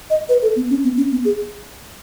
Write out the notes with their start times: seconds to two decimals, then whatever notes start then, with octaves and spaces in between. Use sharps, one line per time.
0.10 D#5
0.29 B4
0.42 A4
0.56 B3
0.70 C#4
0.84 B3
0.97 C#4
1.11 B3
1.25 G#4